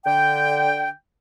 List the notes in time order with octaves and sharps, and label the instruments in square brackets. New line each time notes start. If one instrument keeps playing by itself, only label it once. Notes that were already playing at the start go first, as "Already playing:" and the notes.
[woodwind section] D3 G5